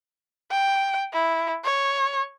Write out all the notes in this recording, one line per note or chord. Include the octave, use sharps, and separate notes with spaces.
G5
E4
C#5